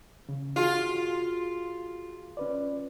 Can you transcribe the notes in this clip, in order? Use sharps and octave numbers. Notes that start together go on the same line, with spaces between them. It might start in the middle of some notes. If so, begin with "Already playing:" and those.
C#3
F4 F#4 G#4 F5
C#4 B4 D5